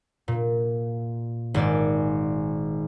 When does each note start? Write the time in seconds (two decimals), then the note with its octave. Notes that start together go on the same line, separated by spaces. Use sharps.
0.28 A#2
1.54 G#1 G#2 D5